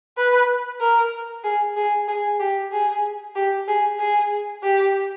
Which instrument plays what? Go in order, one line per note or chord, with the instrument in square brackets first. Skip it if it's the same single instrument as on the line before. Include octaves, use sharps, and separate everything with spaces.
[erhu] B4
A#4
G#4
G#4
G#4
G4
G#4
G4
G#4
G#4
G4